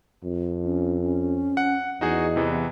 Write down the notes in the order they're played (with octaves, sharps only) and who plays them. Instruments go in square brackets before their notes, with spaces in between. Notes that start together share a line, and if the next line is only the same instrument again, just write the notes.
[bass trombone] F2
[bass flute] C#4
C#4
[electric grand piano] F#5
[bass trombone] E2 [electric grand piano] D#4 F#4 G#4 [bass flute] D#5
[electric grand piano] C3 E3 B3